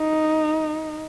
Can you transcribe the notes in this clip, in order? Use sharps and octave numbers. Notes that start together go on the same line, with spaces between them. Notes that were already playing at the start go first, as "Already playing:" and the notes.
Already playing: D#4